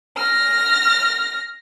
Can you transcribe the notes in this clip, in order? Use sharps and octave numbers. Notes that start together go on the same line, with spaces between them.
F6 A#6